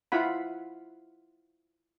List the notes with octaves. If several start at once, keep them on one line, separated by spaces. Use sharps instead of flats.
E4 F4 F#5 B5